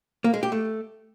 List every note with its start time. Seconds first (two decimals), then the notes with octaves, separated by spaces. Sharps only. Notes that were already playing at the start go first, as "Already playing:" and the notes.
0.24 A#3
0.34 G#3
0.43 G4
0.52 A3